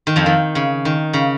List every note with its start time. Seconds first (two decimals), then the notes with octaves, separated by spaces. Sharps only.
0.07 D#3
0.16 F2 F3
0.26 D#3
0.55 C#3
0.85 D#3
1.13 C#3